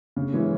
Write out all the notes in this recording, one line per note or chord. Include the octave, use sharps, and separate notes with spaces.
C#3
E3 G#3 C#4